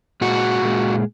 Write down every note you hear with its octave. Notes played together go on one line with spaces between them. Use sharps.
A#2 G#3 F#4
A#2 G#3